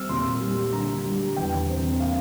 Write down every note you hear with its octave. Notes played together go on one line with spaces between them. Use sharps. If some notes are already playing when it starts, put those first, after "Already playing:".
Already playing: G3 C4 E6 F6
A#2 C6
G3
D3 A#5
G3
E2 G5
C4
A#3 F5